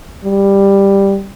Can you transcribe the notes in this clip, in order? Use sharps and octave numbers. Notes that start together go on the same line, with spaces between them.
G3